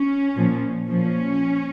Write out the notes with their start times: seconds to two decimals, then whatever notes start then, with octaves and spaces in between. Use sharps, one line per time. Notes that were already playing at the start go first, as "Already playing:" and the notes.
Already playing: C#4
0.35 A#2 F3
0.89 A#2 F3 C#4